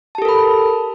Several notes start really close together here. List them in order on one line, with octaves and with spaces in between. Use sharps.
A5 G4 A4 A#4 B5